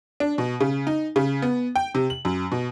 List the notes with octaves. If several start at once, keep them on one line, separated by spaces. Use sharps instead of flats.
D4
B2
C#3
D#4
C#3
B3
G5
C3
F#7
F#2
B2